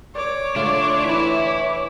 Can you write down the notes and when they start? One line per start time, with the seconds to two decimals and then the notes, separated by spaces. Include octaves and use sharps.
0.15 C#5 D5 D6
0.56 D3 A3 D4 F4
1.05 E3 E5 B5